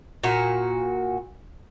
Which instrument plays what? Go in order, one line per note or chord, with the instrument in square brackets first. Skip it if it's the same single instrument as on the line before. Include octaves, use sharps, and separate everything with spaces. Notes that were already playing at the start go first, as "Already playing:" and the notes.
[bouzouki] A#2 F#4